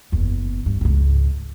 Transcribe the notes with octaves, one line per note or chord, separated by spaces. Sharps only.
F#1 E2
G2
C#2 G#2